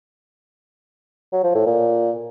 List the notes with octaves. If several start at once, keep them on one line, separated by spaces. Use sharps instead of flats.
F#3
F3
A2
A#2